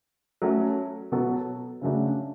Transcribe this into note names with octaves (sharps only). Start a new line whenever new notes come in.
F#3 A3 C#4 F#4 A4
B2 F#3 B3 F#4 A4
C#3 F#3 A3 D4